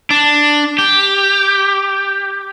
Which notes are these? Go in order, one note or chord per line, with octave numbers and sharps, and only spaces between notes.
D4
G4